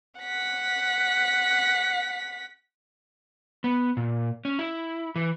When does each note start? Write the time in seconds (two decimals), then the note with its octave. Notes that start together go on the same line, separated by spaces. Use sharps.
0.21 F#5 B6
3.64 B3
3.97 A#2
4.45 C#4
4.59 E4
5.16 E3